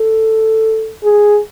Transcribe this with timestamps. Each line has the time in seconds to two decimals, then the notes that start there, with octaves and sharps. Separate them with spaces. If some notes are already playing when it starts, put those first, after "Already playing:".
Already playing: A4
1.04 G#4